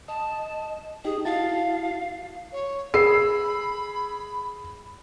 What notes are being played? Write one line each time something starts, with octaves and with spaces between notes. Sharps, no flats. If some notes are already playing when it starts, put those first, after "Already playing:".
D#5 A5
D#4 G4 G#4
E4 F#4 F5 A5
C#5
G#4 B5 E6 C7